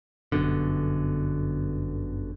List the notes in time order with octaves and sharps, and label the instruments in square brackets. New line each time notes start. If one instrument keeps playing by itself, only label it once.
[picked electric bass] G1 F#2 B2 D3